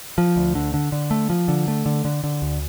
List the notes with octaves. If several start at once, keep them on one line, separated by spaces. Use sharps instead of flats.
F3
D2
D3
D3
D3
A3
F3
D3
A3
D3
D3
D3
D2